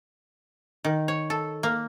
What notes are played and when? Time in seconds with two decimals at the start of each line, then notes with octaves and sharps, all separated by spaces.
0.84 D#3
1.08 C#5
1.30 A4
1.63 A#3